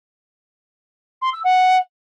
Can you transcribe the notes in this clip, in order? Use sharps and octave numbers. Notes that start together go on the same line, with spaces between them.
C6
E6
F#5